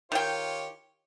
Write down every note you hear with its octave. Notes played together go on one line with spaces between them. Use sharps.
D#3 F4 G4 C#5 G5